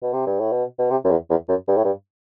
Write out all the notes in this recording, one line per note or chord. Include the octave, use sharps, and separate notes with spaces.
B2
C3
G2
A2
B2
B2
C3
F#2
E2
E2
F#2
G2
A2
G2